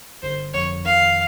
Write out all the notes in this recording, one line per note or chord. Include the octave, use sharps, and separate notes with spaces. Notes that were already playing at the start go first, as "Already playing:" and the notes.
G1 C5
F2 C#5
D#3 F5